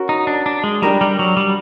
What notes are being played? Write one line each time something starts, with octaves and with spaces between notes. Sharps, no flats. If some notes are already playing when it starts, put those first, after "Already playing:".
Already playing: C#4 F#4 A#4
D#4
D4
D4
G#3
G3 D4 G4 A#4
G3
F#3
G3